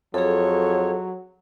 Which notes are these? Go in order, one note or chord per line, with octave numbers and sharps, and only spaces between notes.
F2 F#3 G#4 A4 C#5